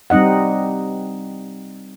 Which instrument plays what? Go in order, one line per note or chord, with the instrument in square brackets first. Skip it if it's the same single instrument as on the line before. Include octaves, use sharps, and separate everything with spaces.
[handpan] G3 C4 D#4 D#5 F#5